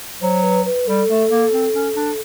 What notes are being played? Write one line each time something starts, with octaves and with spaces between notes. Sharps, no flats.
F#3 C5
B4
B4
G3 A4
A3
A#3
C4
C#4
D4